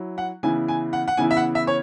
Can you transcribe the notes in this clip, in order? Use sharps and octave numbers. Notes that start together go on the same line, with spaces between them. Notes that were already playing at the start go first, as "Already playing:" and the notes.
Already playing: F#3 E4
F#5
C#3 E3 B3 E4 G#5
G#5
F#5
F#5
C#3 E3 B3 E4 G#5
E5
F#5
E5
C#5